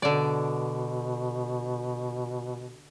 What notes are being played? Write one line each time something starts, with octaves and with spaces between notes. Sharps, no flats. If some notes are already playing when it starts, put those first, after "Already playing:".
B2 D3 D5